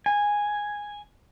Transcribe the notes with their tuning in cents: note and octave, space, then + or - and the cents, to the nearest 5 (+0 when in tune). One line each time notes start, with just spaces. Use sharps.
G#5 -5